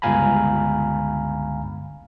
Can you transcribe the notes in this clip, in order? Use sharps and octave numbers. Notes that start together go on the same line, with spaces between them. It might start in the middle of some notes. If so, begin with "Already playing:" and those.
G1 C#2 F5 G#5 A#5 B5